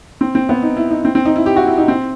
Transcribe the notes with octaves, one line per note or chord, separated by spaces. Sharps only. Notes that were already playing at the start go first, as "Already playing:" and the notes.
C4
C4
B3
D#4
E4
D#4
C4
C4
D#4
E4
G4
F#4
E4
D#4
C4